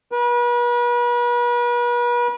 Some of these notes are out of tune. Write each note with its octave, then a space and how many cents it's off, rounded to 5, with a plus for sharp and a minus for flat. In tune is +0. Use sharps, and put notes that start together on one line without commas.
B4 -40